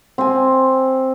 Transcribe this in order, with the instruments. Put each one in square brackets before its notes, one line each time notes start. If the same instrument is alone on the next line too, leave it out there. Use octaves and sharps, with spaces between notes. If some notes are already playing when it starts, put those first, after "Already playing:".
[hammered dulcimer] C4 G#5